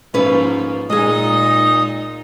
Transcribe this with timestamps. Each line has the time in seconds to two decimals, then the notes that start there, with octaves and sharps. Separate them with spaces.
0.14 G#2 F3 A#3 C#4 B4
0.90 A#2 G#3 D#4 G#4 D#5 D#6